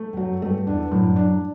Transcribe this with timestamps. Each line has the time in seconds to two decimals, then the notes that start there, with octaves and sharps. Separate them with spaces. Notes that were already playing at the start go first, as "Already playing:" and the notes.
Already playing: A3
0.13 G2
0.17 F#2 F#3
0.42 G2 A3
0.67 E2 E3 D4
0.91 F#2 A2 F#3
1.16 D4